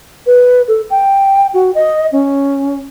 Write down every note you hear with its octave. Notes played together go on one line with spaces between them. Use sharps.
B4
A4
G5
F#4
D#5
C#4